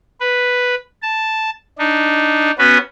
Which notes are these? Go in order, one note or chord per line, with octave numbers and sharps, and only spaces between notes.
B4
A5
D4 D#4
B3 C#4 F#4 B4